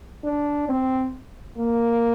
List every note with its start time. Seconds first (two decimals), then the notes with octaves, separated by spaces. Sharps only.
0.24 D4
0.69 C4
1.58 A#3